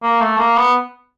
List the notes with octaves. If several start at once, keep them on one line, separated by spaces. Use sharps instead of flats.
A#3
A3
A#3
B3